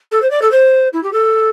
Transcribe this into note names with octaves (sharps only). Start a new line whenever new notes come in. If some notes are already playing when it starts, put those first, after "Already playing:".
A4
C5
D5
A4
C5
E4
G4
A4